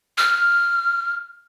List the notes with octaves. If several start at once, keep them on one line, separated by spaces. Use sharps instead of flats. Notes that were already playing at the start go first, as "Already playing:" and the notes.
F6